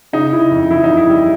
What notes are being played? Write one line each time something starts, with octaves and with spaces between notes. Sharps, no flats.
C#3 D#4
C#3 E4
F2
E3 E4
D#4
F2
E4
G3